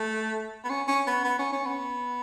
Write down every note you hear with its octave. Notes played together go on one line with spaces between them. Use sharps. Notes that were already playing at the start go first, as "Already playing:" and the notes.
Already playing: A3
B3
C#4
C#4
B3
B3
C#4
C#4
B3